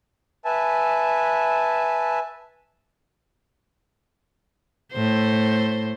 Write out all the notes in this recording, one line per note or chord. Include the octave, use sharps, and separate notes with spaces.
B4 E5 G#5 A5
A2 C5